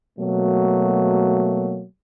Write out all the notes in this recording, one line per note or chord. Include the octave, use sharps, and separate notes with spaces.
B2 F#3 A3 A#3